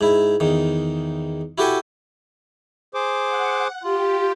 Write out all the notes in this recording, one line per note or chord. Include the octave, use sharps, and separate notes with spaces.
G#2 E4
E2 D#3
E4 F#4 G4 A4 G5 G#5
G#4 C5 D6
F#5
F4 G4